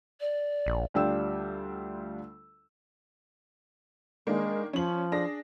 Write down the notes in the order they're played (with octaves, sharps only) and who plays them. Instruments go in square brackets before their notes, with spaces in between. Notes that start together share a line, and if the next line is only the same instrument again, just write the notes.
[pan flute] D5
[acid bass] A#1
[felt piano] D2 G3 D4 F4 G5 E6
[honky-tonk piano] D#3 A#3 D4 [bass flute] G#3
[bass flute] F3 [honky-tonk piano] C#4 F#7
[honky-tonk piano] D4 G#4 A#6